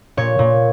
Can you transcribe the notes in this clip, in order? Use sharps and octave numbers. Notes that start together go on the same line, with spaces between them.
A#2 C#5
A#2